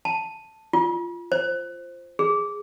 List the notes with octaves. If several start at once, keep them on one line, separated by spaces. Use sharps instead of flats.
A5
F4
C5
G#4